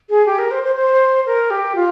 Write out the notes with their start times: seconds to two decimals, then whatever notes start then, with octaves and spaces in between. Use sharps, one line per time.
0.10 G#4
0.26 G4
0.39 A#4
0.51 C5
0.64 C5
0.76 C5
1.26 A#4
1.50 G4
1.76 F4